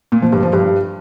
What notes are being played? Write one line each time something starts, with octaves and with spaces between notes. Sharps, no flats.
A#2
F3
G2
F3
G2